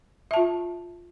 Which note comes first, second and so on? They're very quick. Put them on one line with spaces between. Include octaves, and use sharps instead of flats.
E5 A5 F4